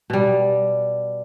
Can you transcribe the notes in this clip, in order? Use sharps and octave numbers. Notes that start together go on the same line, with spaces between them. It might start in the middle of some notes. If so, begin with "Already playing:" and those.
B2 G3